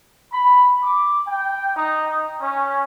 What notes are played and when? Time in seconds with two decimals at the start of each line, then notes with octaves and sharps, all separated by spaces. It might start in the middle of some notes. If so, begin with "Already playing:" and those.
0.32 B5
0.82 D6
1.27 G5
1.76 D#4
2.40 C#4